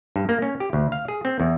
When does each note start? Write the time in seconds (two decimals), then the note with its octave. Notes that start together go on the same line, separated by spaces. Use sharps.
0.16 G2
0.29 A#3
0.42 C#4
0.60 G4
0.73 D2
0.92 F5
1.08 G#4
1.25 C4
1.40 E2